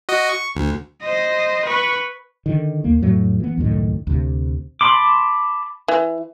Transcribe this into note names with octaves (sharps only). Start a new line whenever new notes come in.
F#4 D#5
C#6
D2
C5 D#5
B4 C#6
D3 D#3
D#2 A#3
F2 A2 F#3 A3
E3 B3
C#2 F#2 A2 D#3
D2 C3
A5 B5 C6 D6
E3